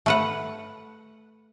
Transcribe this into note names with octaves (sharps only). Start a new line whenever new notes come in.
A3 B4 F#5